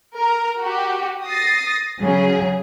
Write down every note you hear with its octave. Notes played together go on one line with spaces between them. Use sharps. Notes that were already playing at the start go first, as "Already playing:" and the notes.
A#4
F#4 G4
D#6 A6 A#6 C7
C#3 F#3 G#4